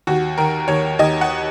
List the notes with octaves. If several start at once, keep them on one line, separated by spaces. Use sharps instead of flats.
D#2 F#4
D#3 A#4
D#2 C#5
D#2 D#5
F#5